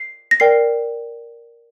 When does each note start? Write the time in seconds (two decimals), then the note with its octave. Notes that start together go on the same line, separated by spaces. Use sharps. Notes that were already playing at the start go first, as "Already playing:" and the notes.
Already playing: C7
0.31 A#6
0.40 A#4 D5 G5 C7